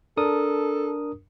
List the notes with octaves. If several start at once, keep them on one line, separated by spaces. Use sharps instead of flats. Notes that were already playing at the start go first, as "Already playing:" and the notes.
D4 A4 A#4 D#6